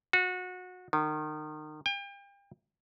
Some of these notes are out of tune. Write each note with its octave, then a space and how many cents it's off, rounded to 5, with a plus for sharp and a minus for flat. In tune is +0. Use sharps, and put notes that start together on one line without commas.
F#4 -25
D#3 -30
G5 +35